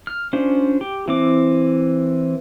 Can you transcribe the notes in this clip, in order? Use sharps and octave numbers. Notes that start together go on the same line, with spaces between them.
F6
C#4 D4 F4 C5
G4
E3 C4 D6